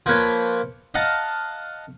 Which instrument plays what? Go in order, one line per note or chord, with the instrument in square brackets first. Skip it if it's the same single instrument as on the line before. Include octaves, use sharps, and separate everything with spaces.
[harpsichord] F3 A#3 B4 C#5
D#5 F5 F#5 A5 A#5